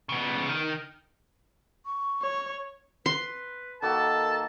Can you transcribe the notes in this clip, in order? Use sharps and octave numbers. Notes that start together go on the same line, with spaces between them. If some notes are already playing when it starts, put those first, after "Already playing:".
C#3 B3
D#3
C#6
C#5
B4 C6
D#3 A#3 F#4 A4 A5